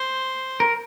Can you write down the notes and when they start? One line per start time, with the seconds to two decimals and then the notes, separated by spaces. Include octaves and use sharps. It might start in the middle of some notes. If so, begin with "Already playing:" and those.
Already playing: C5
0.60 A#4